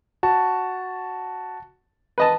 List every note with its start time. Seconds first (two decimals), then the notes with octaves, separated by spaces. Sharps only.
0.23 F#4 A5
2.18 B4 D#5 A5